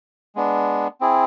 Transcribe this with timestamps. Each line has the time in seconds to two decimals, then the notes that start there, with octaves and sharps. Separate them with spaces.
0.35 G#3 B3 D4
1.01 C4 E4 G#4